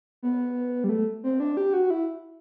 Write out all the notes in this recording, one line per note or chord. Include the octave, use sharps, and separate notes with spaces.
B3
G3
A3
C4
D4
G4
F#4
E4